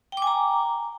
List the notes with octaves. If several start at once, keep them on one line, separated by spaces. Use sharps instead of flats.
G5 G#5 A#5 D6